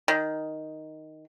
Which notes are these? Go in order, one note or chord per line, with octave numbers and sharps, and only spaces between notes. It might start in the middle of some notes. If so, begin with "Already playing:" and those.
D#3